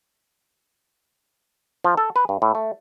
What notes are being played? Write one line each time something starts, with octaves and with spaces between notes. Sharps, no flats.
F3
A4
B4
G2
A2
A3